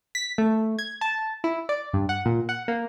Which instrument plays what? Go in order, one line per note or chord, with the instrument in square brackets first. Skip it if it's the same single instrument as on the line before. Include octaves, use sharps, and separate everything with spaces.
[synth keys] B6
A3
G#6
A5
E4
D5
G2
F#5
A#2
F#5
A#3